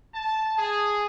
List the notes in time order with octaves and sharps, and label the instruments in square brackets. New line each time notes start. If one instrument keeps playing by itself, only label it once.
[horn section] A5
G#4